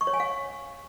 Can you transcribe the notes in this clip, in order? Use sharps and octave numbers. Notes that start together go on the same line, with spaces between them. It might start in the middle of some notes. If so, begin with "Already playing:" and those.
C#6
C#5
G#5
F5